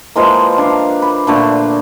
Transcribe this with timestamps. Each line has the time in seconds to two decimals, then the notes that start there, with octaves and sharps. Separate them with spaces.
0.16 E3 F3 G#3 A#3
0.58 D4 F5
1.02 B5
1.27 A#2 D3 A3